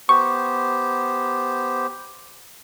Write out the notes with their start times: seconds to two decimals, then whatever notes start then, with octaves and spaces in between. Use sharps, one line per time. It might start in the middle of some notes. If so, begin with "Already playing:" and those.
0.09 B3 G4 C5 C#6